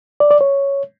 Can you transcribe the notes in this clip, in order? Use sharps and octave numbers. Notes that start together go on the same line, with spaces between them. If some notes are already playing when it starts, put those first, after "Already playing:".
D5
D5
C#5